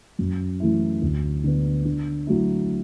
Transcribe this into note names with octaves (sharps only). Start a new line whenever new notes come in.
F#2
E3 A3 E4
D2
D3 B3
D3
F#3 A3 E4